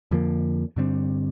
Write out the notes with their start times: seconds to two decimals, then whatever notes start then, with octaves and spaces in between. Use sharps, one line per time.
0.11 F2 D3 F3 A#3
0.76 G2 D3 G3 C4